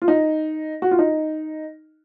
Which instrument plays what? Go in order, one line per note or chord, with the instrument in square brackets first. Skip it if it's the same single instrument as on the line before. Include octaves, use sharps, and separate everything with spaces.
[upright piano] F4
D#4
F#4
F4
D#4